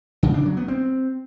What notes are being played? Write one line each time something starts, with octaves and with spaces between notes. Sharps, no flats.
C#3
D4
F#3
B3
C4